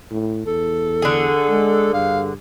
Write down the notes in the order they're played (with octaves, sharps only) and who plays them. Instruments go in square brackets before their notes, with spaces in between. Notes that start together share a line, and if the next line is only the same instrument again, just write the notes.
[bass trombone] A2
[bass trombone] E2 [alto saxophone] A4
[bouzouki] D3 G#4
[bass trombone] G#3
[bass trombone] G2 [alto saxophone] F5